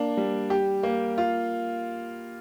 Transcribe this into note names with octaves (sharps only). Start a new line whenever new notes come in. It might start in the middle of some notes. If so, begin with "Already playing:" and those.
Already playing: A#3 D4
G3
G4
A#3
F4